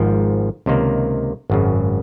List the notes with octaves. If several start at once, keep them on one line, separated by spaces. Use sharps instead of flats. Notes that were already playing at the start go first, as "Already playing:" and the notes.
Already playing: G#1 G#2 F3
C#2 C3 D#3 A#3
G#1 F#2 C#3